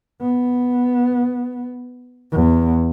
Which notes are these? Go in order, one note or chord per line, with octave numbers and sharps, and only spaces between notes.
B3
E2